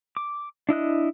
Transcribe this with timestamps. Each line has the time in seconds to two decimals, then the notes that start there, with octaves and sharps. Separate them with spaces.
0.17 D6
0.69 D4 E4 D#5 F#6